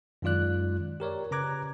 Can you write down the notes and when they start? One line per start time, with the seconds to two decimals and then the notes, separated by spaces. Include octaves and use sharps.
0.22 F#2 D#3 G#3 F4 D5 F#6
1.00 G4 A#4 C#5 D5
1.31 C#3 B4 A#5 D6 F#6 G#6